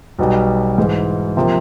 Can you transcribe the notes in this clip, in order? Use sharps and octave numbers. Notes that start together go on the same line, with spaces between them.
B1 B2 G3
G#2 E3 G#3
C3 F3 A#3